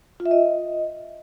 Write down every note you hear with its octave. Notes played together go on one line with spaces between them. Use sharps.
F4
E5
D#5